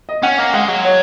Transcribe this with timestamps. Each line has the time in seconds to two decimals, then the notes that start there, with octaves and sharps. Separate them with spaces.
0.09 D#5
0.23 C#4 F#5
0.39 A#3
0.54 G#3 F#5
0.69 F#3
0.85 C#5